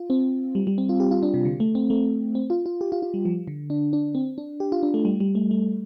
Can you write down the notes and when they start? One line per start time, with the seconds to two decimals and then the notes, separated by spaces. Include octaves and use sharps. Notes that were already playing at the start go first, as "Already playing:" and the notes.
Already playing: F4
0.10 C4
0.55 G3
0.67 G3
0.78 C4
0.89 F4
1.00 G4
1.11 F4
1.23 D4
1.34 C3
1.45 D3
1.60 A3
1.75 C4
1.90 A3
2.35 C4
2.50 F4
2.66 F4
2.81 G4
2.92 F4
3.02 F4
3.14 G3
3.25 F3
3.47 D3
3.70 D4
3.93 D4
4.15 C4
4.38 D4
4.60 G4
4.72 F4
4.83 D4
4.94 A3
5.05 G3
5.20 G3
5.35 A3
5.51 A3